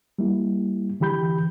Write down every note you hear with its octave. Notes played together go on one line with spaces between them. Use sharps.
G3 A#3 E4
D3 E3 G4 B5 G6